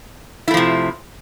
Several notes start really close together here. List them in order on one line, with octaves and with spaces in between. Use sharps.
E4 A3 F3 C3